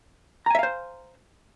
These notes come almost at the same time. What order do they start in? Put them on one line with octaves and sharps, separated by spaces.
A#5 G#5 E5 F5 C5